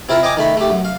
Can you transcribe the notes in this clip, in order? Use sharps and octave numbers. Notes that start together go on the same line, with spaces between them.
C4 E4 F4 A#4
D#5 G5 G#5 A#5 D6
D#3 A3 B5
A3 G4
F#2
F5